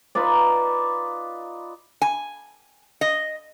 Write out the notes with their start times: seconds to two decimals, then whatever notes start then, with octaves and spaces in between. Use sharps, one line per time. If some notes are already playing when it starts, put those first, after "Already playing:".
0.15 D#4 F4 B4 D5
2.02 G#5
3.01 D#5